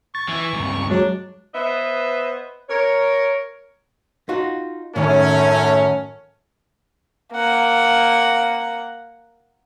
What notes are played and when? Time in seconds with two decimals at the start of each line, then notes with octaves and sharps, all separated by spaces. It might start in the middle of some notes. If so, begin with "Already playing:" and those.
0.15 C#6 A6
0.29 E3
0.54 C#2 G2
0.90 F#3 G#3 D4
1.53 B3 B4 C5 D#5 E5
2.69 A#4 C#5
4.29 D#4 F4 F#4
4.96 F#2 A2 D#3 A3 C#4
7.33 A#3 F#5